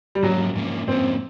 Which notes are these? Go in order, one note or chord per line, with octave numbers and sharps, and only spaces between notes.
G3
G#2 F3 F#3 A#3 C#4
G#2 F3 A#3 C#4
G#2 F3 A#3 C4 C#4